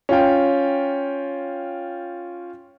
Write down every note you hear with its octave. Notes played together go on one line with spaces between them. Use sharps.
C#4 F4 G5